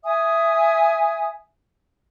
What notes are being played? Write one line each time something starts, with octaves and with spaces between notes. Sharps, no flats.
E5 G#5 D#6